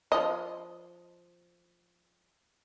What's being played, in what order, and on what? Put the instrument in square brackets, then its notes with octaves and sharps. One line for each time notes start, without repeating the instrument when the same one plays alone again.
[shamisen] F3 D#5